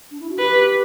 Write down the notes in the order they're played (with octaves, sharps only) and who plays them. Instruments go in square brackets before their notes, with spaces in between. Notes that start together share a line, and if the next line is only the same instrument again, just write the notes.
[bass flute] D4
E4
F#4
[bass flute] G4 [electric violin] B4